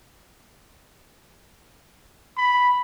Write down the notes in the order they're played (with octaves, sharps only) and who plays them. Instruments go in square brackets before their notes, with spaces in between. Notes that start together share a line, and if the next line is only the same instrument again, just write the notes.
[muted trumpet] B5